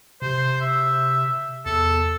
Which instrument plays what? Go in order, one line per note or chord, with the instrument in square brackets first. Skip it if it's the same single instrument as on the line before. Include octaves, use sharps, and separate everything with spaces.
[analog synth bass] C3 [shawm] C5
[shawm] E5
[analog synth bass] E2 [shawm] A4